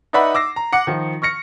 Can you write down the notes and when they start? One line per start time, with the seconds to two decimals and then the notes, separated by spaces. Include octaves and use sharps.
0.13 D#4 B4 D5 E5 F#5 B5
0.35 D6 E6 A#6 C7
0.56 A#5
0.73 F#5 D6 C#7
0.87 D#3 F3
1.22 C#6 F6 A#6 C#7